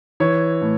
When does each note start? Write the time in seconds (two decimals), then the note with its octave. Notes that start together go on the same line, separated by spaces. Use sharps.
0.20 E3 C#5
0.61 A2